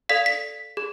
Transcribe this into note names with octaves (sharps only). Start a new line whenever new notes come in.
A4 D5 F5 B6
B6
G#4